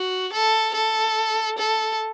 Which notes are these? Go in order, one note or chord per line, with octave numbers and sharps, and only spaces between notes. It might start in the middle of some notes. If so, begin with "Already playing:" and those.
Already playing: F#4
A4
A4
A4